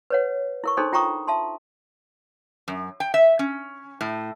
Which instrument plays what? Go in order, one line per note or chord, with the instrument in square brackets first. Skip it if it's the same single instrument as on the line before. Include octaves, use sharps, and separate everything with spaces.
[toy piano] B4 C#5 F#5
E4 A#4 C#6
D4 D#4 G#4 A4 C5 C6
F4 G5 A#5 C#6 D#6
E5 A5 C6
[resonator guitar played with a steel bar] F#2
G5
E5
C#4
A2